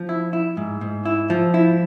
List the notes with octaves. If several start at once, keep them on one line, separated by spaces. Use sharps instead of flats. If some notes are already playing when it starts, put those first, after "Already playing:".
Already playing: F3
E4
E4
G#2
G#2
E4
F3
E4